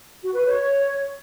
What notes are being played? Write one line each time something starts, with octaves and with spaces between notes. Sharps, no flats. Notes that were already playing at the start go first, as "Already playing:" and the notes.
F#4
B4
C#5